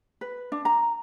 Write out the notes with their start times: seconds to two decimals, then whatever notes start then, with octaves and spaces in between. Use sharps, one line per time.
0.21 B4
0.52 D4
0.65 A#5